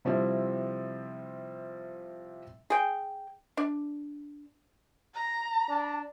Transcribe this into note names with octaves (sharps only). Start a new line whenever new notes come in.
C3 F3 G3 C4 E4
G#4 G5
D4
A#5
D4